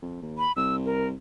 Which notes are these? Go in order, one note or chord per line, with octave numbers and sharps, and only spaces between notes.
F2
D#2
B5
C2 E6
A#4